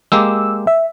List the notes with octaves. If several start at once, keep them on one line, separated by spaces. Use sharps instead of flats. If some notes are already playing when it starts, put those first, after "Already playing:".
G#3 A#3 G4 E6
E5